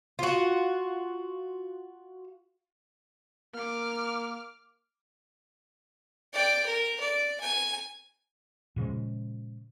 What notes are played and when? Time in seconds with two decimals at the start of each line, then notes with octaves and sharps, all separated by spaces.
0.19 F4 F#4
3.55 A#3 D6 F6
6.33 D5 G5
6.66 A#4
7.00 D5
7.40 G#5
8.76 A#2 C#3 F3 G#3